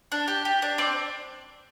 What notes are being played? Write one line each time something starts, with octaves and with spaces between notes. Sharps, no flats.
D4
G4
G4
D4
C4 D5